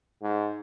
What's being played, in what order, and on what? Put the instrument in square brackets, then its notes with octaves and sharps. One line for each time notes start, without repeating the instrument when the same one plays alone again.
[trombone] G#2